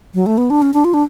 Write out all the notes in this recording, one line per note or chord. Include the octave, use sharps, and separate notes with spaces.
F#3
A3
B3
D4
C#4
D4
F4
D4